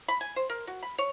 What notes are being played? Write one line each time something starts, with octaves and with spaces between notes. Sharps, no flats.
B5
G#5
C5
A#4
F#4
B5
C#5